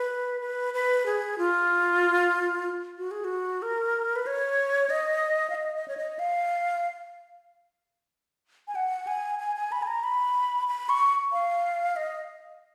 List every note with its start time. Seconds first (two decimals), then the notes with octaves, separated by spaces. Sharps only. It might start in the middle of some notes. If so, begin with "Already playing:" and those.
Already playing: B4
0.41 B4
0.74 B4
1.06 G#4
1.38 F4
2.98 F#4
3.11 G#4
3.24 F#4
3.62 A#4
4.16 B4
4.27 C#5
4.90 D#5
5.50 F5
5.55 D#5
5.76 D#5
5.88 C#5
5.97 D#5
6.19 F5
8.68 G#5
8.75 F#5
9.07 G#5
9.39 G#5
9.56 G#5
9.72 B5
9.82 G#5
9.87 A#5
10.03 B5
10.68 B5
10.89 C#6
11.32 F5
11.96 D#5